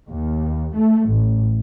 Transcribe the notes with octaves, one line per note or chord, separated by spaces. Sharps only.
D#2
A3
A1